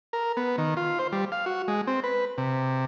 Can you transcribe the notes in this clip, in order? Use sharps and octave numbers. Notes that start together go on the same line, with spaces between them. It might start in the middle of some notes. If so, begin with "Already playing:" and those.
A#4
B3
D#3
F4
C5
G3
F5
F#4
G#3
C4
B4
C3